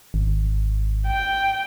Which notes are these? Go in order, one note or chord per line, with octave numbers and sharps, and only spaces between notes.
G#1
G5